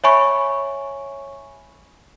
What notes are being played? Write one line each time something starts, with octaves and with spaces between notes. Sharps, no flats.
C#5 E5 G#5 B5 C#6